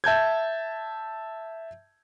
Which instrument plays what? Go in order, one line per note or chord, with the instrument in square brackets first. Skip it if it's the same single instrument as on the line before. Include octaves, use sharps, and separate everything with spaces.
[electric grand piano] E5 A5 G6 G#6